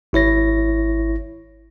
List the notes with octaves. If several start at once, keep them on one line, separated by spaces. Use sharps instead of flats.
G#1 E4 C#5 A#6